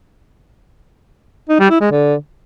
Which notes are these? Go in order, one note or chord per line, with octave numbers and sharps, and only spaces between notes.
D#4
G3
E4
G#3
D3